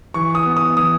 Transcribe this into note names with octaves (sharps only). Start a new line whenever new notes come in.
E3 C#6
D#6
B3
D#6
E3 D#6